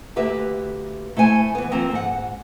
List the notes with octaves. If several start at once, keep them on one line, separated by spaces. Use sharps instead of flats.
D2 A#3 G4 B4 E5
A3 E4 C5 G#5
E3 B3
D#3 F3 A#3 C4
G#2 F#5